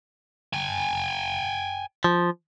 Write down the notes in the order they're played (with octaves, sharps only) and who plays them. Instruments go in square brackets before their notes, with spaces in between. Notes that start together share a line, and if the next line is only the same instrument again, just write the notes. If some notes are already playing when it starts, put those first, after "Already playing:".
[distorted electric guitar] G5 G#5
[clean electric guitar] F3